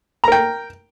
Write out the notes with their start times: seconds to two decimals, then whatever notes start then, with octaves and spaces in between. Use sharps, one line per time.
0.24 A#5
0.28 A#4
0.32 G5